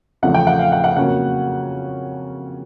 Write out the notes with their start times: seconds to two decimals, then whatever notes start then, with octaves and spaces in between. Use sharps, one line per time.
0.22 E2 C#3 F3 A3 F#5
0.34 G5
0.47 F#5
0.59 F5
0.72 F#5
0.84 F#5
0.97 F2 C#3 F#3 A#3 C#4 F#5